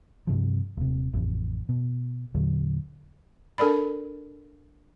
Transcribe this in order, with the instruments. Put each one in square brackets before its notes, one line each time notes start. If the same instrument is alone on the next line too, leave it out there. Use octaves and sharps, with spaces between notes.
[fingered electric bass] G2 C3 F3
D#1 C3
A1 F2
B2
E2 A#2 D3 F#3
[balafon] D4 A4 A#4 D5 B5